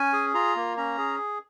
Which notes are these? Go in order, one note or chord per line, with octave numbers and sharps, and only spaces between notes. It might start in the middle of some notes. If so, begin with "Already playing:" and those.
Already playing: C#4 G#5
G#4
F4 A#5
A#3
C#4 A#5
G#4